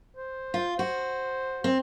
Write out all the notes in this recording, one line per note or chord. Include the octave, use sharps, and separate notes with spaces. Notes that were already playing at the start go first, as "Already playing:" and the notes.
C5
F4
F#4 C5
C4